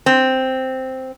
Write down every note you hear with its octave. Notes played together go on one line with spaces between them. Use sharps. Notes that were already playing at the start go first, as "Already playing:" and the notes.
C4